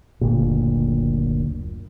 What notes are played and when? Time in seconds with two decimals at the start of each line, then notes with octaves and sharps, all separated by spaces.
0.21 F#1 D2 A#2